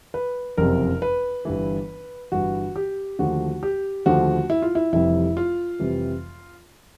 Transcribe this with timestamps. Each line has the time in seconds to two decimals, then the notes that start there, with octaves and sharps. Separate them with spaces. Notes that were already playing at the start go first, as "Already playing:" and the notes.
0.14 B4
0.57 F#1 F2 C3 A#4
1.02 B4
1.45 G1 G2 E3
2.32 G1 G2 E3 F#4
2.76 G4
3.19 D#2 D3 F3 A3 F#4
3.63 G4
4.06 D#2 D3 F3 A3 F#4
4.50 E4
4.62 F4
4.75 E4
4.93 F1 F2 C3 E3 G3 E4
5.37 F4
5.79 F1 F2 C3 E3 G3